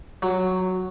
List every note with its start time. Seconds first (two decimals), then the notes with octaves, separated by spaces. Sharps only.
0.22 F#3